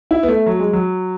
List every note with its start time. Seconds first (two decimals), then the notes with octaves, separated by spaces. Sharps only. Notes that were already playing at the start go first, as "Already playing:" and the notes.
0.11 E4
0.23 B3
0.28 A3
0.47 F#3
0.59 G#3
0.73 F#3